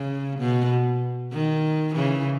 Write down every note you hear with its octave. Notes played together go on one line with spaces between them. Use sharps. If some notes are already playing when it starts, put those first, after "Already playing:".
Already playing: C#3
B2
D#3
C#3 E3